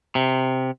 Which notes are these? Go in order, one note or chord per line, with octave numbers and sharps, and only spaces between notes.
C3